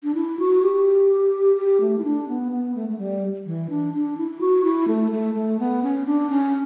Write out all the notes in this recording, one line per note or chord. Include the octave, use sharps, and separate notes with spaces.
D4
E4
F#4
G4
G4
A3
E4
D4
B3
B3
A3
A3
G3
E3
D4
D4
E4
F#4
E4
A3
A3
A3
B3
C#4
D4
C#4